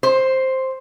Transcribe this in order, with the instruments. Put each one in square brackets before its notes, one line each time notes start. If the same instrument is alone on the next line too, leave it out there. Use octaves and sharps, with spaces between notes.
[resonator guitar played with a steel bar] C5